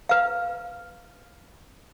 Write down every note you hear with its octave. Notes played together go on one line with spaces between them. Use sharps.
B4 F5